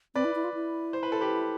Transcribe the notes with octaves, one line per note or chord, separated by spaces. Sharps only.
C4 B4 D5
E4
E4
F4
E4
C5
B4
A4
G4 B4